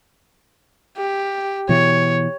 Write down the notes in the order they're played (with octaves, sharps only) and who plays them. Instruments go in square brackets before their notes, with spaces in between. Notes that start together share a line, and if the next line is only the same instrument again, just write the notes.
[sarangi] G4
[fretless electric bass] B2 E3 [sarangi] C#5